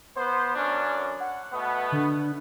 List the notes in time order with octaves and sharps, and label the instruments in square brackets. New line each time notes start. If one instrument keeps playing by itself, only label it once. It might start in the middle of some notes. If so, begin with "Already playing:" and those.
[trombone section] B3 C5
F#2 C#4 D4
[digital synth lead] F#5
[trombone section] B2 A3 B3
[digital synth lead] D3